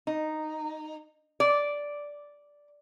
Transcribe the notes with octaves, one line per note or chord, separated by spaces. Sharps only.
D#4
D5